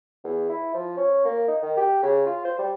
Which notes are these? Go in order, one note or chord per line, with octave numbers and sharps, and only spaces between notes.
E2
E4
F3
C#4
A#3
D#4
D#3
G4
C#3
F4
C5
G3